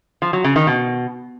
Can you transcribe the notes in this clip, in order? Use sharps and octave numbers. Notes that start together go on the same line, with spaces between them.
F3
F#3
C#3
D#3
B2